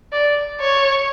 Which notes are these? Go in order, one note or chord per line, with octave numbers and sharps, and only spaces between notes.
D5
C#5